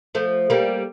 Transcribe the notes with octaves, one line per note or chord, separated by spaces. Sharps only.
F3 A3
G3 A#3